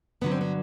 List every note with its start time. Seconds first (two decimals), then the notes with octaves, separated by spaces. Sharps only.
0.21 G2 D3 F#3 B3
0.32 C4
0.41 B3